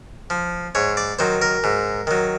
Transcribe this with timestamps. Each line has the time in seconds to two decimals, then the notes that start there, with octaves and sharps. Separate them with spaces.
0.30 F3
0.75 G#2 C#5
0.97 D5
1.19 D#3 F#3 C5
1.42 A#4
1.64 G#2
2.07 D#3 F#3